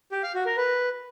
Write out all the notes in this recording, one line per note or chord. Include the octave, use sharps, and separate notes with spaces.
G4
F5
F#4
A#4
B4